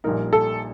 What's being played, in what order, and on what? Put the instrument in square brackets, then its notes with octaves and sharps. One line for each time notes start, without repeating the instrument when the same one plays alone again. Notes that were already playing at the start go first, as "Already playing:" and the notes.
[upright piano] A#1 A#2 G3 A#3 D#4 [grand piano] A#4
[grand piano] A4